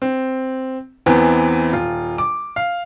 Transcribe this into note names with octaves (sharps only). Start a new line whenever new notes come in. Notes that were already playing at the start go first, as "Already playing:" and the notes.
C4
E2 E3 B3 C4
D#1 F4
D6
F5